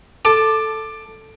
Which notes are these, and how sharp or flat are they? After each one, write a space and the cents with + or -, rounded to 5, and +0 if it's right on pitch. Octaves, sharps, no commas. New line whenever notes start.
A4 +0 A5 -5 D6 +15